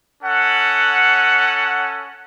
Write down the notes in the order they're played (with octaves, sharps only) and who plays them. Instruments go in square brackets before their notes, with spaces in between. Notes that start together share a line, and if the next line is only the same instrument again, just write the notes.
[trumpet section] C#4 A4 F#5